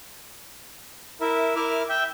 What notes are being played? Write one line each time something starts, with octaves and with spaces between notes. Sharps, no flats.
E4 A#4 E5
E4 A#4 E5 D6 F6
E5 G5